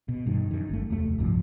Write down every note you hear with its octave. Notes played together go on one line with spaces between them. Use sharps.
B2
G2 D#3
F#2 D#3
G1 A3
F1 D#2 A3
D1 C2 G2 F3